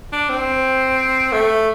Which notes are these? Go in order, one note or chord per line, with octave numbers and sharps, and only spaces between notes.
D4
C4
A3